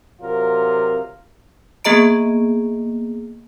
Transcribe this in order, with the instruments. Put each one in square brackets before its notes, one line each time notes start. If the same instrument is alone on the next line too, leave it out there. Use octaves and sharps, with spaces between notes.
[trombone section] C3 F#3 F4 A#4
[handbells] A#3 B3 G#4 D#5 A#5 D7